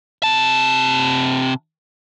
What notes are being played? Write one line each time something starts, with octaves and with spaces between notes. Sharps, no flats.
C3 A5